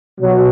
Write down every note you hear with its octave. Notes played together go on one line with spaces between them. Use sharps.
B2 F#3